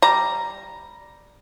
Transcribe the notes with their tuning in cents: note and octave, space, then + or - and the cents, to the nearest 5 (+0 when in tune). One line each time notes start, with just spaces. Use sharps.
G3 +0 A#5 +0